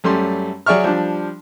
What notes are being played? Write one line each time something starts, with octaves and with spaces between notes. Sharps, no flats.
F#2 G3 A3 C#4 C6
F#3 G#4 D5 E5 C#6 F6
F3 G3 D4